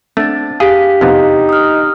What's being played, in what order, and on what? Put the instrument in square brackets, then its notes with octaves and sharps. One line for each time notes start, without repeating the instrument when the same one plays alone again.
[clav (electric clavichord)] A3 [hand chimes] C4 A6 [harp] D4
[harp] G4 [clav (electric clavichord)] G#4 [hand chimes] F5 B6
[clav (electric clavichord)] F2 C3 B3 [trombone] D#4
[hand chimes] D#6 F6